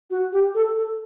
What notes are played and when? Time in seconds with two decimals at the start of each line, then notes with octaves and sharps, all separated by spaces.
0.10 F#4
0.33 G4
0.55 A4
0.76 A4